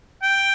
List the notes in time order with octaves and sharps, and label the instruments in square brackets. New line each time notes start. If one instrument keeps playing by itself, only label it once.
[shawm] G5